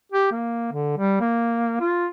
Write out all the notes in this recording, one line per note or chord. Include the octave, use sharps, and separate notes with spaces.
G4
A#3
D3
G3
A#3
F4